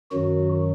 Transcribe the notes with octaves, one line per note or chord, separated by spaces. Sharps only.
F#2 D#3 F#3 F#4